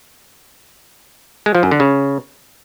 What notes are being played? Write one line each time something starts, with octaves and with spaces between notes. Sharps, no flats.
G#3
F3
F#2
D3
C#3